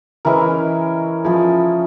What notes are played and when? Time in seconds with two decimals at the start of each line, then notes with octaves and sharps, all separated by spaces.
0.25 E3 G#3 C#4 E4 A#4
1.24 F3 C#4 E4 G#4